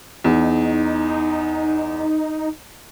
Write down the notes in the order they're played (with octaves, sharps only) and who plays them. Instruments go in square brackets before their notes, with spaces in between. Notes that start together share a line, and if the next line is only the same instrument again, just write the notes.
[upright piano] E2 [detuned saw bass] D#4